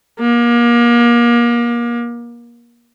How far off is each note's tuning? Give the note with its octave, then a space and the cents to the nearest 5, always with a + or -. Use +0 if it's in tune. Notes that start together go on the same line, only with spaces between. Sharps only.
A#3 +30